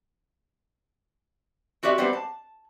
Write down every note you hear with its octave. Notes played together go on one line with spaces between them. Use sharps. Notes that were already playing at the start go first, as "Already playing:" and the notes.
C4 F#4 G4 D5 E5
G3 B3 C4 G4 C5
A5